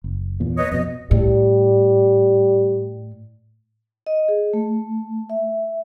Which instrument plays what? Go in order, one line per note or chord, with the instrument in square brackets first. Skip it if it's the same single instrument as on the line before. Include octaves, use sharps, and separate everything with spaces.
[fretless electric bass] F#1
E2 A#2
[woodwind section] B4 C#5 D#5
[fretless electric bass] F2 B2 [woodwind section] D#5
[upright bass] A2 [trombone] G3
[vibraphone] D#5
G#4
A3
E5